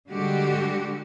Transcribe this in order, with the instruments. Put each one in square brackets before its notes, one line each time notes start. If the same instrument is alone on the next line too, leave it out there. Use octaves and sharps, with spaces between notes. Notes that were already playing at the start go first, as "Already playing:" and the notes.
[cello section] D3 G3 G#3 F#4 G4